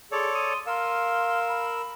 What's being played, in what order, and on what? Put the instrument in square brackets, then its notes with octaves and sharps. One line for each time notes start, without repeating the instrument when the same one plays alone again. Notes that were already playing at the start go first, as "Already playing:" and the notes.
[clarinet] G#4 [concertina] A4 C#5 D5 [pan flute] C6
[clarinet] D#6
[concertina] A#4 E6 [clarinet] F5 [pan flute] C6
[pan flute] B5